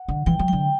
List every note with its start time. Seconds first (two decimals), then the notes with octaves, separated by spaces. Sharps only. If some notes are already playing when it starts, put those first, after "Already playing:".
Already playing: F#5
0.08 D3
0.26 E3 G5
0.39 F#3
0.48 D3 G5